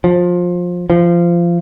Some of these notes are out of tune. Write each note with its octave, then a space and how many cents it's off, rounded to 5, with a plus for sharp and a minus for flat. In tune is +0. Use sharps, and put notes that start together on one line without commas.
F3 +20
F3 -20